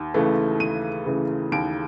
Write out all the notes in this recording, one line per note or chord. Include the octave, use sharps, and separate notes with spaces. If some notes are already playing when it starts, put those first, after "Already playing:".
Already playing: D#2
C#3 E3 A3
D#2 D#7
C#3 E3 A3
D#2 D7